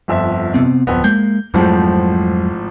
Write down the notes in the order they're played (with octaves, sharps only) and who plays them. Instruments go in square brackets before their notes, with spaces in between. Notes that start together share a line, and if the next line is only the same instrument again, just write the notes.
[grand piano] G1 F2 E5
[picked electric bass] C3 B3 C4
[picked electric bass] D1 [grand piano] F2 B3
[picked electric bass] G#3 A#3 [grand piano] G6
[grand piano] G#1 A2 F3 [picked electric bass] F2 F#3 G#3